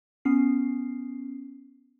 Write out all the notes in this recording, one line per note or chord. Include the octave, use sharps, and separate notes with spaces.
B3 C#4 C7